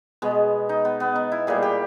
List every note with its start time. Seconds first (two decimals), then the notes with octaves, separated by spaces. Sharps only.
0.22 B2 G#3 B3
0.69 D#4
0.85 B3
1.00 B3
1.15 D#4
1.32 E4
1.47 A#2 G3 G#4
1.63 G4